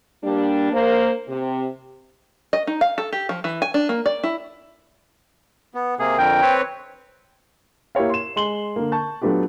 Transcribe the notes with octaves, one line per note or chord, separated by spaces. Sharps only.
G3 A#3 D4
A#3 A#4 C5
C3
D#5
D#4
F5
A4
G4
F3
E3
G#5
D4
A#3
D5
E4
B3
C3 A#3 G#4
F2 D3 A#4 G5
C4 B4 C#5
A#3 E4 G4 C#5 F5
C6 E7
G#3 C6 F#7 G7
D3 A#3
A5 C#6 G6
F#3 A3 B3 D4 F4 G4